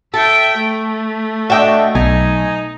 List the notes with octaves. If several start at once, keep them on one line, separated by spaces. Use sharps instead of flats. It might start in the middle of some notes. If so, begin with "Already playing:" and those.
A4 E5 G5
A3
D4 F#4 A4 D#5 E5 G5
B1 D#4 G#5